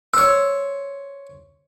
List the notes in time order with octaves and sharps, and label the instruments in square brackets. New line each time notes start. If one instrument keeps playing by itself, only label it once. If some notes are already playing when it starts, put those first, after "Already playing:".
[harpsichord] C5 C#5 [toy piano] E6